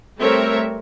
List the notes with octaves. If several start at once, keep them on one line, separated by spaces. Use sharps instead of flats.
G3 A3 C4 A#4 C#5 E5